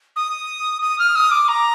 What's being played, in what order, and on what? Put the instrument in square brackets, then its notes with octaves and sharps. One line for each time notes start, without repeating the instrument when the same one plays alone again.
[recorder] D#6
D#6
F6
D#6
D6
A#5